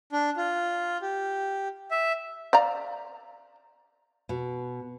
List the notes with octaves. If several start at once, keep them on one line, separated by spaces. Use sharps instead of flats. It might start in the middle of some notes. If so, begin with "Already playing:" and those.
D4
F4
G4
E5
D5 F5 A#5
B2